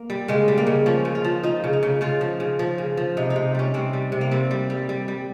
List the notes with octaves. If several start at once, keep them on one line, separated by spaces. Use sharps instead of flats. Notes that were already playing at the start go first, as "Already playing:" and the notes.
Already playing: A#3
G3
C#3 G#3
G3
A#3
C#3
F3 C#4
C#3
F4
F3
F3 D#4
C#3
D#4
C#3
C#3 F4
F3
C#3
F3
C#3
F3
C3 D#4
D#4
C3
G3 C#4
C3 C4
G3
C3
A#3
G3 C4
G3
G3
G3
G3